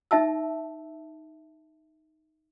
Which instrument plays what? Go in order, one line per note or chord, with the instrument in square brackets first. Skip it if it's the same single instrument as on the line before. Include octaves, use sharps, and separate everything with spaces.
[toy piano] D#4 E5 A5 E6